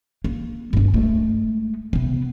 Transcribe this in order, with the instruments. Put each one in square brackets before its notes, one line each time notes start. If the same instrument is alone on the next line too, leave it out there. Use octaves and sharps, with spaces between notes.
[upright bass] A#3
G2 D4
G#3 A3
C3 B3